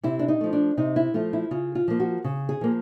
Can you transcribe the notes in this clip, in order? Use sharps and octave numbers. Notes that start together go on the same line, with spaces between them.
C3 E4
D4
D#4
F3 A3
D4
C3 D#4
E4
F3 A3 F4
E4
C#3 F4
F4
F3 A#3
F#4
C#3
G#4
F3 A#3